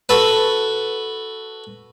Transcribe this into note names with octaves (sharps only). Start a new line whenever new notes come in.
F#4 A4 B4